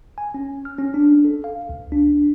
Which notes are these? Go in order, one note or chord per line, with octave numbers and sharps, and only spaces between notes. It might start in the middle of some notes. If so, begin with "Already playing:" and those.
G#5
C#4
F6
C#4
D4
A4
F5
C#2
D4